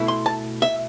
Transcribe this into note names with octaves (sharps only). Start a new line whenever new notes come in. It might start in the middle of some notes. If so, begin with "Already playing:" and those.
Already playing: B2 A3 E4
C6
A5
E5